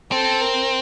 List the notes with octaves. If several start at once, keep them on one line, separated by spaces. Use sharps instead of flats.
C4 A4
A#4